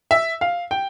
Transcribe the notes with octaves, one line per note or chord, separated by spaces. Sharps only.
E5
F5
G5